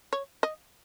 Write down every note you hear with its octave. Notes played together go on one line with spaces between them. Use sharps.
C#5
D#5